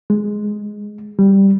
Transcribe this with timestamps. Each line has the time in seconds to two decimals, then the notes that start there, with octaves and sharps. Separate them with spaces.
0.10 G#3
1.19 G3